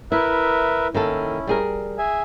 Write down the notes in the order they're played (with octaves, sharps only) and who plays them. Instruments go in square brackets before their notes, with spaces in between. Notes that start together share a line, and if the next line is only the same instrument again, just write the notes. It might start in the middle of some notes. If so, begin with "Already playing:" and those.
[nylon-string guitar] E4 [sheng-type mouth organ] A#4 B4 E5
[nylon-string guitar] D#3 A#3 A4 [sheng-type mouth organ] C#4 E4
[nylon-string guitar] G3 G#4 A#4
[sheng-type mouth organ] G#4 E5 G#5